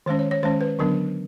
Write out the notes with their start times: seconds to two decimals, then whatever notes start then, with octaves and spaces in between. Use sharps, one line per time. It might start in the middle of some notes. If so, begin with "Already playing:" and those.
0.06 D#3 G#3 C#4 C5
0.19 C#5
0.31 C#5
0.43 D#3 G#3 C#4 C5
0.61 B4
0.79 D3 F#3 B3 D4 A#4